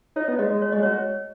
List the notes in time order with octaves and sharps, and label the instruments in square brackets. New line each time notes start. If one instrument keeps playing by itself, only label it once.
[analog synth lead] D#4 [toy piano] C#5
[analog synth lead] B3
[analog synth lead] G#3 [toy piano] D#5
[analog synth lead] G#3
[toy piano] C#5
[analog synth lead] G#3 [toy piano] D#5
[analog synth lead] F#4 [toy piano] C#5